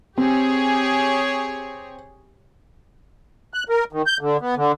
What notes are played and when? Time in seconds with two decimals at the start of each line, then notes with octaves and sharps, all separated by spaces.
0.18 C4 G4 G#4 C#5
3.54 F#6
3.69 A#4
3.93 D#3
4.06 G6
4.21 D3
4.41 B3
4.57 D3